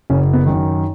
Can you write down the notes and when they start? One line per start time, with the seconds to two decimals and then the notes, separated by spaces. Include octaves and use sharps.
0.10 F#1 C#4
0.33 B3
0.46 F#2 D#3